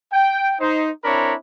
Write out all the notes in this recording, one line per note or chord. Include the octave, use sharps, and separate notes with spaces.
G5
D#4 C5
C4 D4 E4 A#4 C#5 B5